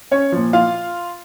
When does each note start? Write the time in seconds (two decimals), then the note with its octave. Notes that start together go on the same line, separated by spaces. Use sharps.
0.11 C#4 C#5
0.32 A#2 F3
0.53 F4 F5